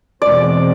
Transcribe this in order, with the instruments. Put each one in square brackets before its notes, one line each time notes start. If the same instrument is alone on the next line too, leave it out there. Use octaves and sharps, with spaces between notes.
[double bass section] E2 B2 G#3 C4 [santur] D5